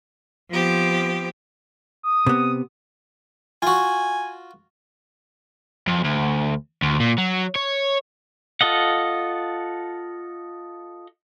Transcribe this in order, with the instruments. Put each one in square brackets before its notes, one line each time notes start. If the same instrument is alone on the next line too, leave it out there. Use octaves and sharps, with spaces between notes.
[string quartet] F3 B3 C4 G4
[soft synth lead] D#6
[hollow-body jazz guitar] C3 B3
[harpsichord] F4 F#4 [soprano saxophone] G#5
[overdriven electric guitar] F2
D2
D2
A#2
F#3
C#5
[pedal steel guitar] F4 A4 D#5 F#5